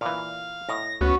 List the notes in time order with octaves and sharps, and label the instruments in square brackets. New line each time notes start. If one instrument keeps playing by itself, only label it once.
[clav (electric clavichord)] A#2 E3 [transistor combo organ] F5
[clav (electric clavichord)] A2 D#5 [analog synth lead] A#6
[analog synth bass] D2 [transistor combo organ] B3 C#4 [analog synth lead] F#4